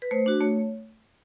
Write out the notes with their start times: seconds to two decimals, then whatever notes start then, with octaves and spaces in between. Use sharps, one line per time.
0.02 B4
0.11 A3 C5
0.26 D4 F#4
0.41 A3 C#5